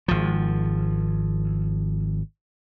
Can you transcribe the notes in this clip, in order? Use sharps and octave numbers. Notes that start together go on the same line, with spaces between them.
G#1 F3